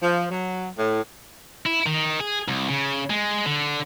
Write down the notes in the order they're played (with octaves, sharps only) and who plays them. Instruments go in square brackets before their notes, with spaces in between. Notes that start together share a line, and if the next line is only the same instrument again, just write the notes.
[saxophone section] F3
F#3
A2
[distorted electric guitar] E4
D#3
G#4
C2
C#3
G#3
D3